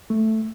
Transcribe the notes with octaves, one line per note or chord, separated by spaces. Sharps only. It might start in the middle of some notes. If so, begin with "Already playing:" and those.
A3